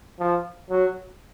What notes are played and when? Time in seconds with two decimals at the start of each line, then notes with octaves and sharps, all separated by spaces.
0.19 F3
0.70 F#3